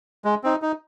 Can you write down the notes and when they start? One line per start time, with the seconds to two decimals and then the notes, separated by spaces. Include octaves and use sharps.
0.25 G#3
0.44 C4 D#4
0.62 D#4